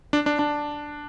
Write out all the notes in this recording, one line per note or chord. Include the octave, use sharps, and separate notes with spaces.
D4
D4
D4